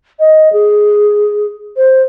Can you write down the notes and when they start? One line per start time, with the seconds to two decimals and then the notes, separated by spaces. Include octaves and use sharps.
0.19 D#5
0.53 G#4
1.77 C5